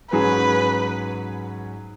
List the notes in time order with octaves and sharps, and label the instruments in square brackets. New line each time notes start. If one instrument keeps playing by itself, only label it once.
[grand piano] G#2 F#3 C#4 G#4 [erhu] B4